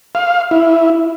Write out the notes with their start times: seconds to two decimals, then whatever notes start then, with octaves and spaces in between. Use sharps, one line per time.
0.15 F5
0.51 E4